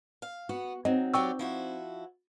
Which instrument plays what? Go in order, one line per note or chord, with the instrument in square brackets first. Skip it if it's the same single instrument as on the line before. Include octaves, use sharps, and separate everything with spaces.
[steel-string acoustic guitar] F5
[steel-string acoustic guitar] B3 [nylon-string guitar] F#4
[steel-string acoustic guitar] F#3 [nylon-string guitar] C4 D#4 [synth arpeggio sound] D#5
[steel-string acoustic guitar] F#3 G4 D5 [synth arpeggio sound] G5 C#6 E6
[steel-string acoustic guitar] F3 E4 F#4